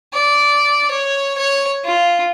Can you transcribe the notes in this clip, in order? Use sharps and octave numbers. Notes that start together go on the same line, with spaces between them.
D5
C#5
C#5
F4